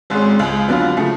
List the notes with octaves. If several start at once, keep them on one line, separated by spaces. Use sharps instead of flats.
G#1 G#2 G#3 C#4
C#2 C#3 G#3
F2 D3 F#3 B3 F4
C#3 F3 A3